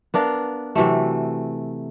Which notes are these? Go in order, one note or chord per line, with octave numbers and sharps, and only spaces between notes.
B3 D4 A#4 F5
C3 E3 F#3 A3